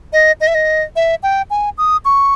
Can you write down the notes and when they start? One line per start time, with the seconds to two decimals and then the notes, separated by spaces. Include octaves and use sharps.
0.13 D#5
0.40 D#5
0.47 E5
0.55 D#5
0.96 E5
1.23 G5
1.50 G#5
1.78 D#6
2.05 C#6